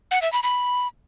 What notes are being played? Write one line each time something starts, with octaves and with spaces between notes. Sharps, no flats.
F#5
E5
B5
B5